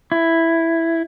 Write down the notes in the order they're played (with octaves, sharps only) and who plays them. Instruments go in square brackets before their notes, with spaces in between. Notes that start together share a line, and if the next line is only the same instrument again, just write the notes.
[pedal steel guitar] E4